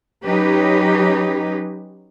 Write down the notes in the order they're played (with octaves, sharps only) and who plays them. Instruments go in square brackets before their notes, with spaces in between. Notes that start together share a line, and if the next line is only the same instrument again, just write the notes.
[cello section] F#3 C#4 D#4 G4 B4